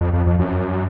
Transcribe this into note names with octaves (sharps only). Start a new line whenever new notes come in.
F2
F2
F2
F#2